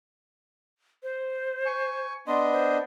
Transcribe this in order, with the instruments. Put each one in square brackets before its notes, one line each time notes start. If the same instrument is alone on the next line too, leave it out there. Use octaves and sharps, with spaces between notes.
[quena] C5
[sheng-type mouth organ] G#5 C#6
[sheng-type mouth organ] B3 D4 D#5 [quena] C6
[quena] C5